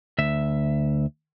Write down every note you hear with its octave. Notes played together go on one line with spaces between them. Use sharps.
D2 E5